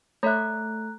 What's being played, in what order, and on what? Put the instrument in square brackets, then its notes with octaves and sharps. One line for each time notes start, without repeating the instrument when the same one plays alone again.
[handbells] A3 A4 [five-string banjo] C#5 E5 [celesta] A#5 F#6